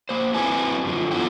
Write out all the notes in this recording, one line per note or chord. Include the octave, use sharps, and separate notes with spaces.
A#3 C5
F#3 C4 E4 B4 G#5 A5
F#2 D3 F3
B3 E4 F4 A4 F#5 G5